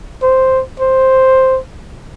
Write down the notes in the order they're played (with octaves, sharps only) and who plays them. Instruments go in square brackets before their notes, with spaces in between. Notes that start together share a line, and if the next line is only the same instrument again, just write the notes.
[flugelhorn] C5
C5